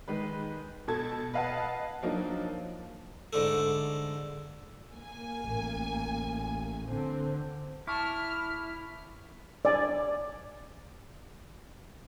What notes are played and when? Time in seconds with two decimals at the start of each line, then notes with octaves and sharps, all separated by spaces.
0.08 D#3 G#3 B4
0.88 B2 A4 A5 G#6
1.34 B4 D#5 F5 F#5 A5
2.03 F3 F#3 A#3 D4 D#4
3.33 G#2 D3 A3
4.92 A#3 G#5
5.42 A1
6.89 D3 C4
7.87 E4 A5 C#6 D6 F6
9.65 D5 G#5